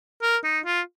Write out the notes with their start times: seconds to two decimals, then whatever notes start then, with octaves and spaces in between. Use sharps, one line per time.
0.22 A#4
0.44 D#4
0.65 F4